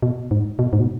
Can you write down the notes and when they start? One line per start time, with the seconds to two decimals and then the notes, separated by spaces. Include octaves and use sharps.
0.03 B2
0.31 G#2
0.59 B2
0.73 G#2
0.80 B2